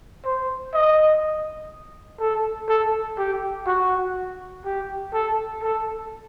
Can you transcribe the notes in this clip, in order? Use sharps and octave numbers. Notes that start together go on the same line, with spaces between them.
C5
D#5
A4
A4
G4
F#4
G4
A4
A4